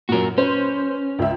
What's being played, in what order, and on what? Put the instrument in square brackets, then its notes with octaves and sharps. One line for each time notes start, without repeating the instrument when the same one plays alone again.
[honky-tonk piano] F#2 A#2 [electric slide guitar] F#4 A#4
[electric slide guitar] C#4 [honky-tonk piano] B4 C5
[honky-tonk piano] C#2 E5